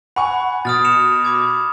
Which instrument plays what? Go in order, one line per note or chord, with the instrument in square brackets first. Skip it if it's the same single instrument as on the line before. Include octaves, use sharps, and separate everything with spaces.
[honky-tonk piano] F#5 G#5 C#6 [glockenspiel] B5
[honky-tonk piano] B2 [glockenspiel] D#6 F6 A6
[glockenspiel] C#7 E7 F7
B5 D6 G#6